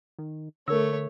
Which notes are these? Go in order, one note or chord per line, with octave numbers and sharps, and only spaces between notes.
D#3
D3 A3 A#4 C#5 E6